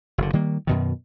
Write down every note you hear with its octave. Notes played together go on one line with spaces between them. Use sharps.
F#1 D3
D#3 G3 A#3
F#2 B2 D#3